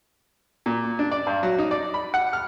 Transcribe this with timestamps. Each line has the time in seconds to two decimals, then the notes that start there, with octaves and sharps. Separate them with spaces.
0.66 A#2
0.99 D4
1.12 D5
1.27 G2
1.43 F#3
1.58 D#4
1.71 D5
1.94 B5
2.14 F#5
2.33 F6